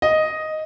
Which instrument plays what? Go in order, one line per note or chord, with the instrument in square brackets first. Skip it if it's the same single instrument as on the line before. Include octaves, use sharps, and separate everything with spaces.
[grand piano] D#5